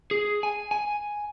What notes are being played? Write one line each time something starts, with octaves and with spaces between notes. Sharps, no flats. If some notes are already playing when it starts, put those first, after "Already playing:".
G#4
G#5
G#5